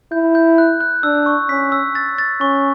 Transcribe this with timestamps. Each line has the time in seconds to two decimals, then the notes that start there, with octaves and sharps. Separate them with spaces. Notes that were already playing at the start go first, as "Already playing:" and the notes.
0.12 E4 G6
0.35 G6
0.58 F#6
0.81 F#6
1.03 D4 E6
1.26 C#6
1.49 C#4 B6
1.72 E6
1.95 A6
2.18 A6
2.41 C#4 C#6